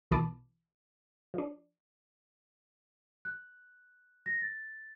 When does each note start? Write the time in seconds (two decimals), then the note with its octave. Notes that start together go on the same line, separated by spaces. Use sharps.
0.11 B1 B2 E3 A5 B5 D6
1.34 F3 D4
3.25 F#6
4.26 A#6
4.42 A6